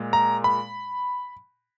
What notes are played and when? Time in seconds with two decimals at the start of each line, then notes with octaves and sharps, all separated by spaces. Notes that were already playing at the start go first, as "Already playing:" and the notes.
Already playing: A#2 G#3
0.13 A#5
0.44 B5